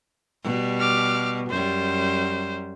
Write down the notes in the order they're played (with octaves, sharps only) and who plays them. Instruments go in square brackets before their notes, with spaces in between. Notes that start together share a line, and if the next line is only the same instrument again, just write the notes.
[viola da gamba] B2 G3
[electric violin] D6 F6
[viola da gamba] F#2 G3 [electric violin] C5